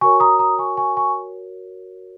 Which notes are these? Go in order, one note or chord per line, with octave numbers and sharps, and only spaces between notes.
F#4 A#4 C#5 G#5 C#6
A#5 D#6
A#5 D#6
G#5 C#6
G#5 C#6
G#5 C#6